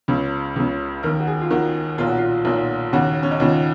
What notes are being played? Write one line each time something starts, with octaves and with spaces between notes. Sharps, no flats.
C#2 C#3
C#2 C#3
D#2 D#3 A#4
F#4
G#4
F4
D#2 D#3 F#4
B1 A#2 F4
F#4
F4
B1 A#2
D#2 C#3 F#4
C#4
D#4
D#2 C#3 F4